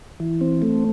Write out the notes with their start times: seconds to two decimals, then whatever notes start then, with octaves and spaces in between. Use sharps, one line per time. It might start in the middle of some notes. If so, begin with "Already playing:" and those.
0.20 E3
0.41 C4
0.62 A3